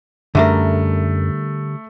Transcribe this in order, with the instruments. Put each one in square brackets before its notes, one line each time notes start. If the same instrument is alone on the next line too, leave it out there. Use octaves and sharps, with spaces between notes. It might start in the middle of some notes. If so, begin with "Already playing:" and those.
[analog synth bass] F#2 [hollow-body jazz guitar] D3 G3 A#4 [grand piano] A3 [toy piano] G#4 E5 A#5